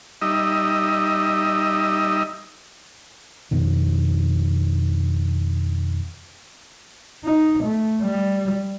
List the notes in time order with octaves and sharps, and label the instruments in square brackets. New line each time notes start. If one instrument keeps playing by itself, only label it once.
[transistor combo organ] G3 D#4 D#5 E5
[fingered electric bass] F2 B2 D#3
[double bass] D#4
A3
G3